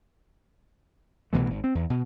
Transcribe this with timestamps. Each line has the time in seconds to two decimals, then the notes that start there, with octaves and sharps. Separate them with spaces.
1.33 C2 B2 E3 A3
1.50 G#1
1.64 C4
1.75 E2
1.90 B2